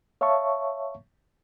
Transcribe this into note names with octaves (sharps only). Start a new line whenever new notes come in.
C#5 E5 F5 A5 C#6